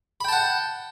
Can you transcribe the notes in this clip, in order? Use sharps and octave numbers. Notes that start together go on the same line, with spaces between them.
F#5 G5 A5 B5